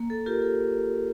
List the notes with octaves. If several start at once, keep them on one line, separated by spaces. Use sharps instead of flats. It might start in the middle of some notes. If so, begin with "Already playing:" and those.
Already playing: A#3
A4
F4 G4 A#4
A4